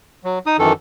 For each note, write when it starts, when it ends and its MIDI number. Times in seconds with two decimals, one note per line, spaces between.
0.24 0.39 54
0.46 0.57 63
0.46 0.57 87
0.59 0.73 42
0.59 0.73 51
0.59 0.73 52
0.59 0.73 69